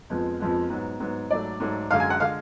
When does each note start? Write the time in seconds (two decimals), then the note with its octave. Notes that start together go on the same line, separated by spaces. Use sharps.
0.10 F2 F3 G#3 B3
0.40 F2 F3 G#3 B3
0.70 G#2 F#3 B3
1.00 G#2 F#3 B3
1.31 G#2 F#3 A3 D5
1.60 G#2 F#3 A3
1.91 F#2 D3 G#3 F5
2.00 G#5
2.10 F#5
2.20 D3 G#3 F5